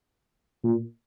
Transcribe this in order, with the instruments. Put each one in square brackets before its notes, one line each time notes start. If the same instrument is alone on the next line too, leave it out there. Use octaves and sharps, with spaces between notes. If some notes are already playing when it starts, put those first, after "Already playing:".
[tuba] A#2